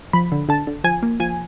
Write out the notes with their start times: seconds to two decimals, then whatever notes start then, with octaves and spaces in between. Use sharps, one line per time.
0.13 F3 B5
0.32 D3
0.49 D3 A5
0.67 D3
0.84 F3 G#5
1.03 A#3
1.20 F3 G#5